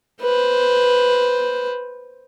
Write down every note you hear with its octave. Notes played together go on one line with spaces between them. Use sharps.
B4 C5